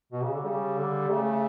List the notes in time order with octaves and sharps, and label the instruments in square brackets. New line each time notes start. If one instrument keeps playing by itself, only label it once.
[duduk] B2
C#3
D3
[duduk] C#3 [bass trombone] G3
[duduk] D3
[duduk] C#3 [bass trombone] A3